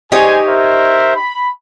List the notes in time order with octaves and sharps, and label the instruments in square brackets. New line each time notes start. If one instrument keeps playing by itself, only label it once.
[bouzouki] D#4 G4 C#5 [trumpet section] G#4 C5 G#5
[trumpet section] A#4 C5 E5
B5